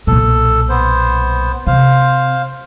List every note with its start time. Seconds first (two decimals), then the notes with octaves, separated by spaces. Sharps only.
0.07 B1 A#2 A4
0.69 B3 C5
1.67 C3 C5 F5